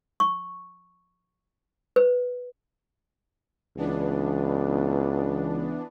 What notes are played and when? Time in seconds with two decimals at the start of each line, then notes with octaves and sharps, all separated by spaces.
0.20 C#6
1.96 B4
3.77 C#2 E3 B3 D4